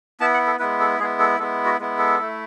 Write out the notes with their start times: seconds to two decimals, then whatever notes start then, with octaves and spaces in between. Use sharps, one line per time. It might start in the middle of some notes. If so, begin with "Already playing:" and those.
0.20 B3 E4 A5
0.34 F#5
0.47 A4
0.59 G#3 B3 E4 B4
0.80 A4
0.99 G#3 B3 E4 G#4
1.20 A4
1.39 G#3 B3 E4 A4
1.65 F#4
1.79 G#3 B3 E4
1.98 A4
2.19 A3 E4